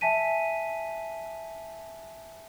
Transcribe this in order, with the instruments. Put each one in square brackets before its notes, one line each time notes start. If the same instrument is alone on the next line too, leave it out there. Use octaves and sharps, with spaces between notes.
[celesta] E5 G#5 A5 B6 D#7